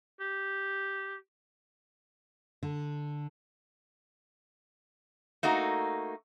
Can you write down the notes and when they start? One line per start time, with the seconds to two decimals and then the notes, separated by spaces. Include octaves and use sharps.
0.20 G4
2.63 D3
5.43 A3 A#3 D#4 F#4